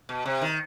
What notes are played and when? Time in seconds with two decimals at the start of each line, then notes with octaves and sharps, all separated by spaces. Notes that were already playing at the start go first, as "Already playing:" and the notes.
0.09 B2
0.26 C3
0.41 D#3